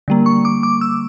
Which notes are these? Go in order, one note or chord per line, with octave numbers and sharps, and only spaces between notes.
D3 G3 A#3
C#6
D6
D6
E6